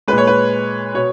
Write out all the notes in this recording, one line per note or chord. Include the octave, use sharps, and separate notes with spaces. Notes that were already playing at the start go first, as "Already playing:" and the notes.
A#2 G#3 B4
C#5
B4
B2 C#5